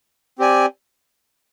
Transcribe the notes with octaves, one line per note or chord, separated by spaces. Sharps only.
C4 G4 D5 G#5